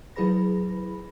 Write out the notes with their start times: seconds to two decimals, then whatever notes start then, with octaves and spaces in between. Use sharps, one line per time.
0.16 F#3 E4 G#4 B4 B5 A#6